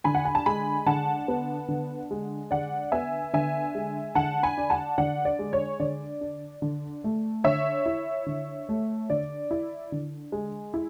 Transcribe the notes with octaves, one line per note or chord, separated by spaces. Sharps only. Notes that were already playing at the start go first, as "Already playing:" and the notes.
D3 G#5 B5
F#5
G#5
A5
G#3 G#5 B5
D3 F#5 A5
B3
D3
G#3
D3 D5 F#5
B3 E5 G#5
D3 E5 G#5
G#3
D3 F#5 A5
G#5 B5
D4
F#5 A5
D3 D5 F#5
D5
G#3
C#5
D3 D5
D4
D3
A3
D3 C#5 E5
E4
D3
A3
D3 D5
E4
D3
G#3
E4